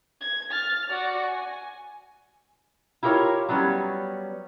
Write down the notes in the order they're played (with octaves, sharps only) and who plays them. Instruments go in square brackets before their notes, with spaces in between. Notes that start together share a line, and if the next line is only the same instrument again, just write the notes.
[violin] G#6
F6 A6
F#4 D5
G#5
[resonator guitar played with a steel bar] E4 F4 G4 A#4 C#5 F5
F#3 G3 B3 C#4